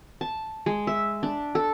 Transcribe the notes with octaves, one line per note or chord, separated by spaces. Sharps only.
A5
G#3
E5
D4
A4